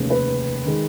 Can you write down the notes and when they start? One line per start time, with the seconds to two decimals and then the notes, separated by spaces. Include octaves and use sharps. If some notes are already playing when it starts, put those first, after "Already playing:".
Already playing: F1 D#2 C#3
0.10 B4
0.65 D#3 G#3